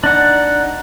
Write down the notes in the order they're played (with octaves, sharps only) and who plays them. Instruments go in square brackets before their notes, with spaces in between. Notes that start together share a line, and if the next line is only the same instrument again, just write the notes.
[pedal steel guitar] D4 D#4 F#5